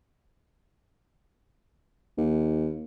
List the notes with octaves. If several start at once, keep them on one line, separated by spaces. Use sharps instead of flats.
D#2